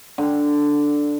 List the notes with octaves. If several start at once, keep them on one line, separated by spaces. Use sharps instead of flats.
D3